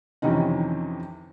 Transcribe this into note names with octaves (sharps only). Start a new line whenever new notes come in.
F2 C3 D#3 E3 C#4 D#4